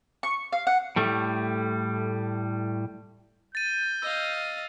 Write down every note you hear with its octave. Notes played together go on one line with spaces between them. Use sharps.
C#6
F5
F#5
A2 G3 A3
G6 A6 D#7
D#5 F5 E6